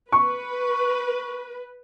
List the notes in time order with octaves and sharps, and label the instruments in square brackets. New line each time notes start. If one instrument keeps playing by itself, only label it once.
[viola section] B4 [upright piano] C#6